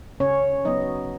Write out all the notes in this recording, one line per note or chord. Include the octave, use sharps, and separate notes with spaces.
C#3 C#4 C#5
F#3 B3 D#4 D#5